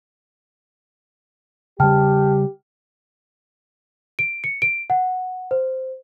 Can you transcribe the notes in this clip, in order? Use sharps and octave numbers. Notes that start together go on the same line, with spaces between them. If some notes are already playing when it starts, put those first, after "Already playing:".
C#3 G3 G4 G5 A5 F6
D7
C#7
D7
F#5
C5